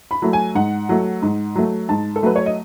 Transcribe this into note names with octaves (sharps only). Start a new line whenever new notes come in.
B5
F#3 A3
G#5
G#2 F#5
F#3 A3
G#2
F#3 A3
G#2 A5
A4
F#3 A3 B4
C#5
D#5